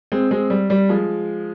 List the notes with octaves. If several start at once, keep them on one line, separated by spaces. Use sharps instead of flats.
G#3 C4
G#3 C4
G3
G3
F3 G#3